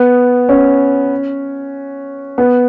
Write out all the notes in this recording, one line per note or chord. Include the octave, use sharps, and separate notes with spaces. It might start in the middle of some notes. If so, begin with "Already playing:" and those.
Already playing: B3
C#4
B3